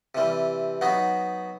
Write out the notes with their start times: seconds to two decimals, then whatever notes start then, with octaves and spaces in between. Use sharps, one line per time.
0.15 C3 E3 G3
0.81 F#3 B3 D#4